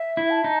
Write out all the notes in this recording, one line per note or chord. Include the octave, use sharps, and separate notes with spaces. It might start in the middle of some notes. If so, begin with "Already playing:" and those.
Already playing: E5
E4
A5
D#4